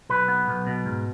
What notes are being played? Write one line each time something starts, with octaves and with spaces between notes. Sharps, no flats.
B1 B4
B3
B1
B2
G#2